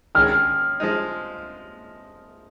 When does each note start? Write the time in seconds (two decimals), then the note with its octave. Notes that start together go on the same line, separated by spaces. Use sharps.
0.15 D#3 G#3 C#4 G#4 F6
0.80 F3 G#3 D#4